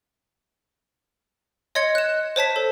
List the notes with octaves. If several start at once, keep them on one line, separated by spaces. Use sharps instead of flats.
C#5 D#5 C6 G#6 C#7
F#6 E7
C5 C#5 A5 B6
A4